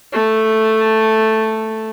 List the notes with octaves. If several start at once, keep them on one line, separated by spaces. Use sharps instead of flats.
A3 A4